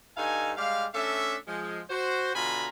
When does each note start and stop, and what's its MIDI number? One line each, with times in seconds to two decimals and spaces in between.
0.17 0.52 43
0.17 0.52 63
0.17 0.52 69
0.17 0.52 77
0.17 0.52 80
0.57 0.86 55
0.57 0.86 56
0.57 0.86 74
0.57 0.86 77
0.95 1.37 57
0.95 1.37 61
0.95 1.37 62
0.95 1.37 69
0.95 1.37 76
1.48 1.81 53
1.48 1.81 56
1.90 2.34 66
1.90 2.34 72
2.35 2.69 47
2.35 2.69 50
2.35 2.69 65
2.35 2.69 80
2.35 2.69 82
2.35 2.69 83